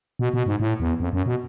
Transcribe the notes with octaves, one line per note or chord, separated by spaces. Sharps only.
B2
B2
G#2
A2
E2
F2
F#2
B2